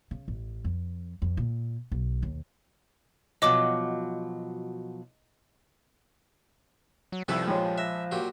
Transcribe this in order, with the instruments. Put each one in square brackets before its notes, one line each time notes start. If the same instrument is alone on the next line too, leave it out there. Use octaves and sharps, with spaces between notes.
[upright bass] C#3
A1
F2
F2
A#2
B1
D#2
[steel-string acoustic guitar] B2 F3 F#3 [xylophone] D#5 D6
[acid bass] F#3
[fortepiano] C2 E5 E6 [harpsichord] G2 A4 B4 [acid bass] F3
[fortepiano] A#1 G#3 [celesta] C#5 G5
[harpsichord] E5 [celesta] F#6 A#6 E7
[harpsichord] A#2 F#3 G4